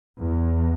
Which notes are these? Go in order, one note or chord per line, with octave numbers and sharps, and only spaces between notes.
E2